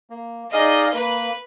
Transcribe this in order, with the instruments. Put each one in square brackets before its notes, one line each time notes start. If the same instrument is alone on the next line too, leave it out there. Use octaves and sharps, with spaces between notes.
[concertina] A#3
[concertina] D#4 G#4 D5 F5 [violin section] D#5
[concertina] A#3 [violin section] B4